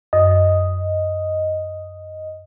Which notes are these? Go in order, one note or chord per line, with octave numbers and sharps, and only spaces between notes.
F#2 D#5